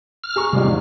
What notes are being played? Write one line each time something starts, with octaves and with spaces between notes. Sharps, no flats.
F6
G#4 A#5 C#6
G#1 C3 G3 G#3 F4
E2 G#2